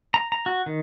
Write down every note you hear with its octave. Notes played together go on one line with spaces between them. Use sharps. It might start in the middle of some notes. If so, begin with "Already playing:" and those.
A#5
A#5
F#4
D#3